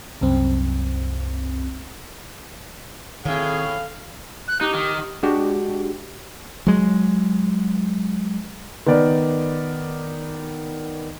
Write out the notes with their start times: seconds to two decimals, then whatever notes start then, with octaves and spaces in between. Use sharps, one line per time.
0.21 C2 F#2 C4
3.25 A2 D#3 C4 G#4 F5
4.48 F#6
4.61 D#4 G4
4.74 D#3
5.23 G#3 D4 F#4 G4
6.67 F#3 G#3
8.86 D#3 B3 A#4 D5